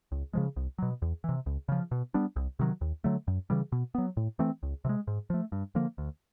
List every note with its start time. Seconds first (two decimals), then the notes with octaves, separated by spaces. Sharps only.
0.12 C#2
0.33 C#3 F3 G#3
0.56 C2
0.78 B2 F#3
1.02 E2
1.24 C3 E3
1.46 C#2
1.69 C#3 F3
1.91 B2
2.14 G3 B3 D4
2.36 C2
2.59 C3 D#3 F#3
2.81 D#2
3.04 D3 F#3 A3
3.28 F#2
3.50 C#3 E3 G3
3.72 B2
3.95 F#3 B3
4.17 A2
4.39 E3 A3 C4
4.63 C#2
4.85 C3 E3
4.89 G#3
5.07 G#2
5.30 F3 A3
5.52 G2
5.75 D3 F3 A#3
5.98 D2